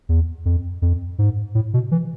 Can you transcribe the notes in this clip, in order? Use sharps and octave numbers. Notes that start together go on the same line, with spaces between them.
E2
F2
F2
G#2
A2
B2
E3